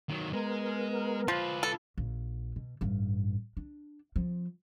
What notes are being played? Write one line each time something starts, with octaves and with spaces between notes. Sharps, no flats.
D#3 F#3
G#3 B3 A#4
F3 F4 B4
A4
A#1
B2
A1 G2
D4
F3 C4